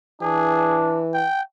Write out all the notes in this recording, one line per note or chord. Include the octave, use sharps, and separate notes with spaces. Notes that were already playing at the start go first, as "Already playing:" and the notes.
E3 D4 G#4
G5